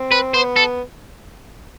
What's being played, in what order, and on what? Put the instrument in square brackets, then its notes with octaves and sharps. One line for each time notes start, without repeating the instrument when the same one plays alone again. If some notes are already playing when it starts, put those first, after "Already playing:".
Already playing: [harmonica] C4
[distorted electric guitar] B4
[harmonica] B3 [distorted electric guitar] C5
[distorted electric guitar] A4